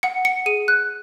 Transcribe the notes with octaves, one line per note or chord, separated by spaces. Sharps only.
F#5 C#7
C#7
G#4 D#7
F#6